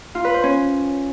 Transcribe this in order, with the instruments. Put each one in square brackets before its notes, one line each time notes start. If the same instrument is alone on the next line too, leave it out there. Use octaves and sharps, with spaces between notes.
[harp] F4
B4
C5
C#4